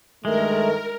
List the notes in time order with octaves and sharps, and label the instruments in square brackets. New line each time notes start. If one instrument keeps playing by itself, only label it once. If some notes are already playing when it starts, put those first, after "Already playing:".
[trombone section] G2 D#3 A3 [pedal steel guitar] G#3 [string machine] A#4 [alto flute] E5